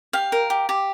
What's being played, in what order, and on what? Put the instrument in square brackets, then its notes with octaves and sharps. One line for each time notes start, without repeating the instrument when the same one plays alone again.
[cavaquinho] G4 F5
A#4
G4
G4